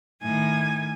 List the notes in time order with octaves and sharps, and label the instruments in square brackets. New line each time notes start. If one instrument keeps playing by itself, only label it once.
[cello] A2 D#3 [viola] G#5